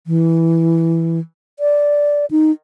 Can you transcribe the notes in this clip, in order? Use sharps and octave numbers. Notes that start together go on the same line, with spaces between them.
E3
D5
D#4